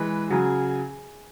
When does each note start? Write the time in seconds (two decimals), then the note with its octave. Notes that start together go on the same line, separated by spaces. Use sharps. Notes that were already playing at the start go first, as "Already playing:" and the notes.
Already playing: E3 G#3 B4
0.30 C#3 F#3 G#4